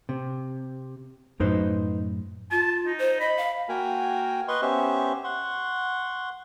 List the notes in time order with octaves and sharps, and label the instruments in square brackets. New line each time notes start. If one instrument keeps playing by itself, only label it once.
[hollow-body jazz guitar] C3
[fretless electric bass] F#2 A2 F#3 [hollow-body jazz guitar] D#4 B4 C5
[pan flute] F4 [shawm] A5
[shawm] D#4
[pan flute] C5
[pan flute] D#5 [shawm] B5
[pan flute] F5
[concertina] A#3 F#4 A#4 G5 G#5 A#5
B4 D#5 C6 C#6
B3 C#4 G4 C5 E5 C#6
F#5 C6 C#6